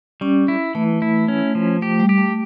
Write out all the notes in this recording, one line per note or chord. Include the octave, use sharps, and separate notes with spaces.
G3 C#4
E4
E3 A3
E4
C#4
F3
A3 G4
G3
G4
A3